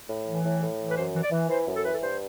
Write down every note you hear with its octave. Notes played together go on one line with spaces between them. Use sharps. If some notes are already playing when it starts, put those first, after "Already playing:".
A2
E3
A2
A2
E3
B4
F#2 C5
E3
D5
E3
E3 C5
F#2
A4
E3 B4
A4
G2 C5